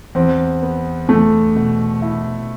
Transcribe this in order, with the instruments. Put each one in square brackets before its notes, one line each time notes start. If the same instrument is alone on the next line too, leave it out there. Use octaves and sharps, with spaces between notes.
[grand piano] E2 [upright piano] C4
[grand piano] B3
[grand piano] E2 [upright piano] A3
[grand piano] B2
E4